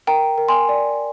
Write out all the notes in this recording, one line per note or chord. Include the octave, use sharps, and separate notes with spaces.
A#4 G5 A#5
A#4
G#5 C6
D5